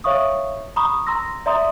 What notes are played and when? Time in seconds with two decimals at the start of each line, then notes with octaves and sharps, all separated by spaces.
0.04 C#5 E5 F5 C#6 D#6
0.76 A#5 B5 C#6 D#6
1.07 A#5 C6 E6 A#6
1.46 D5 E5 A#5 C6 D#6